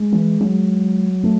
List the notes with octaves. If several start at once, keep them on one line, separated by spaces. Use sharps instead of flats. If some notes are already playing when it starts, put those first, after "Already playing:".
Already playing: G#3
E3
F#3
A3